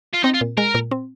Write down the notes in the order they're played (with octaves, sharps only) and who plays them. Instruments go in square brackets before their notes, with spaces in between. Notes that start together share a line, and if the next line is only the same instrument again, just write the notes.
[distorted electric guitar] F4
[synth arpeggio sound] C4 [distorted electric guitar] D#4
[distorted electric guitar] F4
[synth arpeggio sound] A#2
[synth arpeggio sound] G#3 [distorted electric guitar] A#4
[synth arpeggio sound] A#2
C4